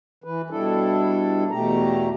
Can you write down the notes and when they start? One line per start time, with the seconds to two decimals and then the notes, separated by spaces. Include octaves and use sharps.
0.24 E3 B4
0.50 B2 G3 D4 E4 A4
1.51 E2 B2 A3 G4 A#5